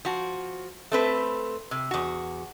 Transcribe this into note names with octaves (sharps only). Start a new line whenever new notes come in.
F3 F#4
A3 C4 B4
C3
E2 F#4